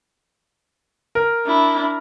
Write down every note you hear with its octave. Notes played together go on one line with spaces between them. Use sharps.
A#4
D4 E4